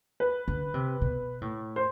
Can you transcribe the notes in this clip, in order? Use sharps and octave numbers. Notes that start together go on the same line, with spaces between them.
B4
D3
C3
B2
A2
C5